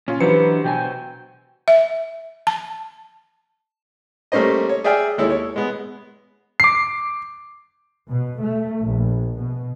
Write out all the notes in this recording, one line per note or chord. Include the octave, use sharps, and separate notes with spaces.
A#2 C#4 F4
E3 F#3 D4 G4 B4 C5 C#7
B2 A#4 G5 G#5
E5
A5
G3 A3 A#3 C#4 C5 D#5
C#5
G#4 D5 E5 G5 G#5 F6
D#2 G#3 E4 A4 C#5
C#5
G#3 B3
D6 C7
B2
A3
A#1
B2